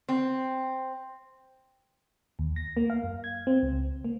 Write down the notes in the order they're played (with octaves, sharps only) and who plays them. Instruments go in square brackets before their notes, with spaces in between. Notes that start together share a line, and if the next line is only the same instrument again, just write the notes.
[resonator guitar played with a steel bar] C4
[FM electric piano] D#2
A#6
A#3
F5
F#2
G#6
C4
C#2
A#3